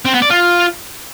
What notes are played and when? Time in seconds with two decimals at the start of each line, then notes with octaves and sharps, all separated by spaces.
0.05 C4
0.14 B3
0.22 D5
0.30 F4